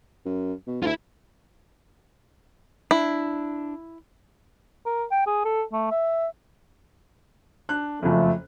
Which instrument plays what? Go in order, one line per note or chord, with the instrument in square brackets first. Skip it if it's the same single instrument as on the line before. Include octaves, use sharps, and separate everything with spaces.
[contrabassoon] F#2
B2
[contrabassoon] D2 [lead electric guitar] E4 F4
[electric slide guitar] D4 [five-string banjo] E4
[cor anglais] A#4
G5
G#4
A4
A3
E5
[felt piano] D4 F#6
[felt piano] F#1 F2 [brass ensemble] F3 A3